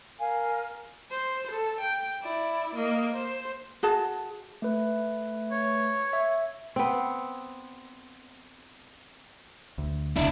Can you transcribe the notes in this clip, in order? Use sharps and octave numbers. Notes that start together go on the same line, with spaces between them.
A#4 F5 G#5
C5
A4
G5
E4 D5
A#3 D#5
C5
F#4 G#4 A5
A3 B4
C#5
E5
B3 C4
D2
E1 C#2 C#3 D4 E4